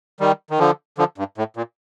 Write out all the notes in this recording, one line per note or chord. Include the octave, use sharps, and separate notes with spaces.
D#3 G3
D#3
D3 F3
D3 F3
G2
A2
A#2